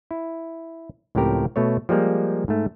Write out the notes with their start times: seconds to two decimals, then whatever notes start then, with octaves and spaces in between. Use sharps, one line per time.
0.11 E4
1.15 C#2 A2 F3 C4 G4 A#4
1.56 B2 A3 C#5
1.89 F3 G3 G#3 A#3
2.48 G#2 A3